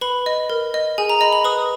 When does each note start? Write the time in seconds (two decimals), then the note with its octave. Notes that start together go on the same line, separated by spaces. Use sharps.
0.01 B4 B5
0.26 D#5
0.50 A#4
0.74 D#5
0.98 G#4 G#5
1.09 A#5
1.21 D#5 B5
1.33 B5
1.44 B4 D#6